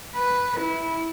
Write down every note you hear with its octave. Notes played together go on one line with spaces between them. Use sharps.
B4
E4